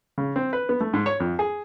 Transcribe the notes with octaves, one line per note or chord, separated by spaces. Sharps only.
C#3
C4
B4
B3
A3
G#2
C#5
F2
G#4